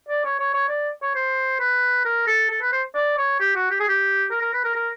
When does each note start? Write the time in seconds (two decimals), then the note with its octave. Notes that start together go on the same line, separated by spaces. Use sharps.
0.09 D5
0.25 C#5
0.39 C#5
0.54 C#5
0.68 D5
1.02 C#5
1.15 C5
1.59 B4
2.05 A#4
2.27 A4
2.50 A4
2.61 B4
2.72 C5
2.95 D5
3.18 C#5
3.40 G4
3.56 F#4
3.70 G4
3.80 G#4
3.88 G4
4.31 A#4
4.41 A#4
4.53 B4
4.64 A#4
4.75 A#4